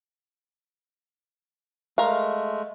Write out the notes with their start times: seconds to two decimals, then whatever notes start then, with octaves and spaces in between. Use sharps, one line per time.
1.98 G#3 A3 A#4 F5